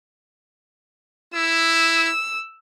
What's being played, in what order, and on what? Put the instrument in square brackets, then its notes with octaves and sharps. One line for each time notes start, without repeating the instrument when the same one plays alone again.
[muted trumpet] E4 [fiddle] E6